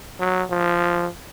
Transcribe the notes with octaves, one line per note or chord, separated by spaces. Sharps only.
F#3
F3